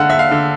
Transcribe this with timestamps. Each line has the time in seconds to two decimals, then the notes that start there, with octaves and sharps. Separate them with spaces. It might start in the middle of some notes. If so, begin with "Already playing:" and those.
Already playing: D3 G#3 F5 F#5
0.10 E5
0.19 F5
0.31 D3